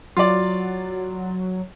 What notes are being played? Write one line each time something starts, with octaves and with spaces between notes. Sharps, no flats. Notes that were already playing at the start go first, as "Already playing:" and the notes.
F#3 F4 D5